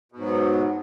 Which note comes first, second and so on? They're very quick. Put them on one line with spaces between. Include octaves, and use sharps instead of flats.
B2 G#2 F#3 B3